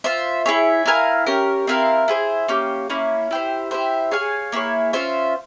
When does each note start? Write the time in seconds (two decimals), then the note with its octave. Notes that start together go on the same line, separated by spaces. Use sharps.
0.04 F4 C5 E5
0.46 E4 G#4 C#5 E5
0.86 E4 A#4 F5 G#5
1.26 C#4 G4 A#4
1.67 C4 E4 A#4 F5
2.08 E4 G#4 C5
2.48 A#3 C#4 G4
2.89 A#3 C#4 E4
3.31 E4 G4 C5
3.71 E4 G4 C5 E5
4.11 G#4 C#5 F5 G#5
4.52 A#3 E4 G#4 C#5
4.93 C#4 F4 C5 E5